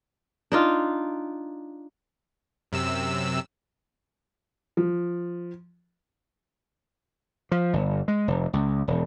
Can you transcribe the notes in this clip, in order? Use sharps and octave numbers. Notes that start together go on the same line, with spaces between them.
D4 D#4 F4
F#2 C3 E6
F3
F3
G1
G#3
F1
C#2
E1